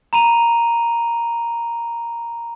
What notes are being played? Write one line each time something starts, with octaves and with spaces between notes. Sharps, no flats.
A#5 B5 D#7 F7